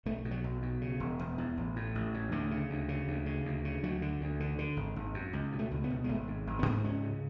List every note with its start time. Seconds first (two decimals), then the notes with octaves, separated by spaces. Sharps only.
0.06 B1 A3
0.25 B2
0.31 F#3
0.44 B1
0.62 B2
0.81 C#3
1.00 E1
1.19 E1
1.38 E2
1.57 A1
1.76 A2
1.95 A1
2.14 A2
2.32 D2 D3
2.51 C#3
2.70 D2
2.88 C#3
3.08 D2
3.26 C#3
3.45 D2
3.65 C#3
3.83 D2 F#3
4.02 D3
4.21 D2
4.40 D3
4.59 D3
4.77 G#1
4.96 G#1
5.14 F#2
5.33 C#2
5.52 B2
5.59 A3
5.71 C#2
5.84 B3
5.90 B2
6.04 G#3
6.09 G#1 A3
6.27 G#2
6.47 G#1
6.59 B3
6.66 G#2
6.84 C#2 C#4
7.03 C#3